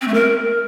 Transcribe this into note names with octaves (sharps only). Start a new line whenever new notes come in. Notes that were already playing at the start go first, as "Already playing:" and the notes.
C4
A3
A#4